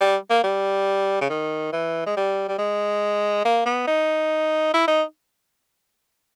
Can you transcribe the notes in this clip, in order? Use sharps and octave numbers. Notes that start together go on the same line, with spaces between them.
G3
A#3
G3
C#3
D#3
E3
G#3
G3
G3
G#3
A#3
B3
D#4
E4
D#4